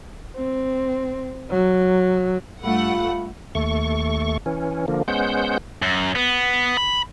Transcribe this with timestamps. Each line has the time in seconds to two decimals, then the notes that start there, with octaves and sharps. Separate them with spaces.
0.37 C4
1.51 F#3
2.63 G2 A3 F4 F5 F#5 B5
3.55 D#2 A3 C#6
4.46 E3 C#4
4.88 D3 F3 A#3
5.08 G#3 B3 C#4 C5 F#5 G6
5.82 F#2
6.15 B3
6.77 B5